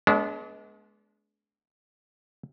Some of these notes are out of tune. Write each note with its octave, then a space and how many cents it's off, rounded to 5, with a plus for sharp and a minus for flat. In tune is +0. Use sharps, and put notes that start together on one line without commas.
G#3 +30 B3 -20 D4 -30